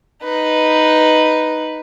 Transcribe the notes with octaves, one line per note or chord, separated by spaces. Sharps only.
D#4 B4